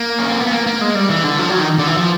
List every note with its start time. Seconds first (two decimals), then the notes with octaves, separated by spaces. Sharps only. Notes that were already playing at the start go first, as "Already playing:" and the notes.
Already playing: A#3
0.18 C#4
0.29 C4
0.41 B3
0.51 A#3
0.67 A#3
0.81 G#3
0.95 G3
1.09 E3
1.24 D3
1.39 F3
1.49 F#3
1.59 D#3
1.78 D3
1.87 E3
1.97 F3